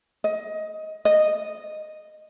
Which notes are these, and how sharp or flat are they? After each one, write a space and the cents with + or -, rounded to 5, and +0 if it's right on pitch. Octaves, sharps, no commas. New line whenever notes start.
D#5 +15
D#5 -10